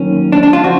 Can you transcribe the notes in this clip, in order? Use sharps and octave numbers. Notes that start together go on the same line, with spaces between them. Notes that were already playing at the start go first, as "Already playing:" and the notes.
Already playing: D#3 F#3 A#3 C#4
D4
D4
F4
C#3 F3 F#4